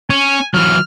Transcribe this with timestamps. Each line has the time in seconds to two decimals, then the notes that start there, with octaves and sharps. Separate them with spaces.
0.10 C#4 G#5
0.54 E3 F#3 F6